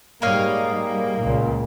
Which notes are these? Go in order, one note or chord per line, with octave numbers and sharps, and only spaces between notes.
G#2 G3 A#3 C#5 D#5 F5
C#2 A#2